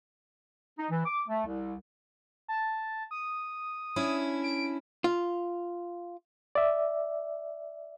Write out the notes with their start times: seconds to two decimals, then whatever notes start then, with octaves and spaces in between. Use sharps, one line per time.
0.79 D#4
0.91 E3
1.05 D6
1.28 A3
1.46 C2
2.48 A5
3.11 D#6
3.96 C#4 D4 E4
4.43 D7
5.04 F4
6.55 D5 E5